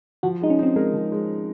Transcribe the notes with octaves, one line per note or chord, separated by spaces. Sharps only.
F3 F#4
G#3 D#4
C#4
C4 D#4
G#3 A#4
F3
G#3